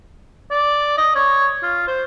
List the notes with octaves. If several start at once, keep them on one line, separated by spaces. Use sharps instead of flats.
D5
D#5
C#5
F4
C5